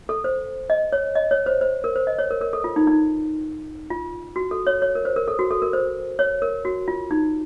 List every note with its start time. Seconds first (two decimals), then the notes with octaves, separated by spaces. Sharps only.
0.09 A4
0.24 C5
0.70 D#5
0.92 C#5
1.15 D#5
1.31 C#5
1.46 C5
1.61 C5
1.84 A#4
1.96 C5
2.07 D#5
2.18 C#5
2.31 A#4
2.41 A#4
2.53 A4
2.64 F4
2.76 D#4
2.87 D#4
3.90 F4
4.36 F#4
4.51 A4
4.67 C#5
4.82 C#5
4.95 A#4
5.05 C5
5.16 A#4
5.28 A4
5.39 F#4
5.51 A4
5.62 A#4
5.73 C5
6.19 C#5
6.42 A#4
6.65 F#4
6.88 F4
7.11 D#4